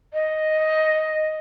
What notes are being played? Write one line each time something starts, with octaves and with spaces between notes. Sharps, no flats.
D#5